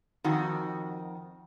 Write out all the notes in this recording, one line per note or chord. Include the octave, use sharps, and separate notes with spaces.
F2 D#3 F#4